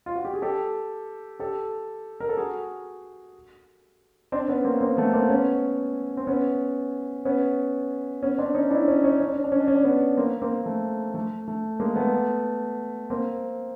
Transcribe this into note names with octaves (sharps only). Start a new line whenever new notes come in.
F4
F#4
G4
G#4
G4 A4
G4 A4
A#4
A4
F#4 G#4
C4 D4
B3 C#4
A#3 C4
A#3 C4
A3 B3
A#3 C4
B3 C#4
C4
B3 C#4
B3 C#4
B3 C#4
C4 D4
C#4 D#4
D4 E4
C#4 D#4
C#4 D#4
C#4
D4
C#4
D4
C#4
D4
C#4
D4
B3 C#4
A#3 C4
A#3 C4
A3
A3
A3
G#3 A#3
A3 B3
A#3 C4